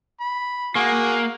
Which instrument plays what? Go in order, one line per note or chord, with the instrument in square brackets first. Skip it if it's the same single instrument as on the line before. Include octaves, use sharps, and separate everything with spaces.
[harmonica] B5
[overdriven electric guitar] A#3 [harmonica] F#4 G#4 C#6